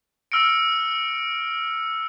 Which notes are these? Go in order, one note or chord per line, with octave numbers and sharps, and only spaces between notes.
E6 F6 A#6 C#7 D7